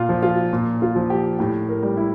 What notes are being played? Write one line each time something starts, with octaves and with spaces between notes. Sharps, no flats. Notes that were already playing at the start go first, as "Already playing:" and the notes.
Already playing: A#2 F4
F3
F4
A#2
F4
F3
G4
A2 G4
A#4
G3
E4